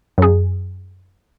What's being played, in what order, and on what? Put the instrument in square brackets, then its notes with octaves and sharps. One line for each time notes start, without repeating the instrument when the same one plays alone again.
[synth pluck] F#2 G#4